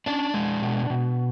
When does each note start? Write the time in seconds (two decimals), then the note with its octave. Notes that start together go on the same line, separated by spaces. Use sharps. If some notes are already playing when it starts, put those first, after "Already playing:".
0.06 C#4 D4 D5
0.34 G#3
0.62 B2
0.90 B2